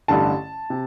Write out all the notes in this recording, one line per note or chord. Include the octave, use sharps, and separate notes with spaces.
A1 G2 D3 A5
C3